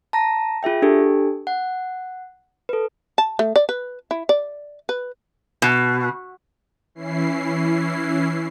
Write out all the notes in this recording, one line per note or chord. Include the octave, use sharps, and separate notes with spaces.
A5 A#5 A#6
F4 G#4 E5 G5
D4 G4 A4
F#5
A4 B4
A5
A3
D5
B4
E4
D5
B4
B2
E3 C#4 E4 C7